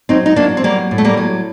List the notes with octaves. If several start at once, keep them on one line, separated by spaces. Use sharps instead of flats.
F#3 C4 D#4
D#4
F#3 A#3 D4
C4
F#3 G3 A#3
A2
A3
G3 A#3
F#3